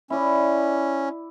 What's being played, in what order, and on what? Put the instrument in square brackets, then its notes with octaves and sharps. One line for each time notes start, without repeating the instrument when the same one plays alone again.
[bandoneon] C#4 [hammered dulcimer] E4 D5